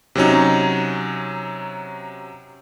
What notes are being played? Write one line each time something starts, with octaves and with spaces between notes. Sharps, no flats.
C3 F#3 C#4 D#4